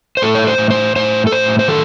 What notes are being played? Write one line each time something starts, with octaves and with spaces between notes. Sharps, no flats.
C5
A2 A4
C#5
C5
A2
C5
A2 C5
A4
A2 C5
C5
D#3 A4